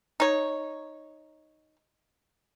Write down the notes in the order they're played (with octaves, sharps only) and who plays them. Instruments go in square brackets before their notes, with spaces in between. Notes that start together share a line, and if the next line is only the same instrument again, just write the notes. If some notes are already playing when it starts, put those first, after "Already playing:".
[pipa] D#4 C#5